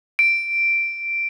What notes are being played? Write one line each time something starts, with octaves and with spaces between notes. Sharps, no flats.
D7